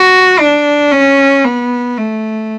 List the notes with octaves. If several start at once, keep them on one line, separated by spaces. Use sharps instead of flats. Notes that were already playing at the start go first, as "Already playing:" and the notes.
Already playing: F#4
D4
C#4
B3
A3